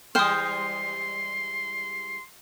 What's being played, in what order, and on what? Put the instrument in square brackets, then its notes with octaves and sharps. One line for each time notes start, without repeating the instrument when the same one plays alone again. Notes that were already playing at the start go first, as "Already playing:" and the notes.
[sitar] E3 G3 G#3 [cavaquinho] C5 G5 [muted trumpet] C6 [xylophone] D#6 F6